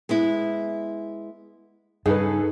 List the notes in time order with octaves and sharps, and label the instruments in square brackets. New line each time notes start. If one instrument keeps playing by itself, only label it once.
[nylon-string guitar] G#3 B3 E4
[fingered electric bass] G2 [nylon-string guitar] C#3 [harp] D#4 [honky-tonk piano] G#4 A4 B4